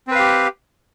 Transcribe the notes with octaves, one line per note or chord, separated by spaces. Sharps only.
C4 G4 B4 F5